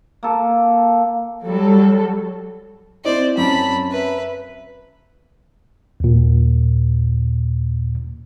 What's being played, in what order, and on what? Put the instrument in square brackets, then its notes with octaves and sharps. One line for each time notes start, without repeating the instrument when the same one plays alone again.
[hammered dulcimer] A#3 A4
[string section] F#3 G3 A4
[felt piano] C4 E4 D#5 [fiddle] C5 D5
[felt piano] F#2 C4 C#4 [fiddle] A5 B5
[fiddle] B4 E5
[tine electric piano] D#2 A#2